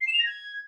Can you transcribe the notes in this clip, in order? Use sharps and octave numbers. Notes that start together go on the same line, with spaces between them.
C7
E7
F7
A#6
G#6